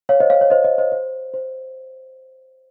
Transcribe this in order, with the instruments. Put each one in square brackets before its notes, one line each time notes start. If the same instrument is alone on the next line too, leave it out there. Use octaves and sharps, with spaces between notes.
[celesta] C#5 F5
C5 D#5
C#5 F5
C#5
C5 D#5
C5 D#5
C5 D#5
C5
C5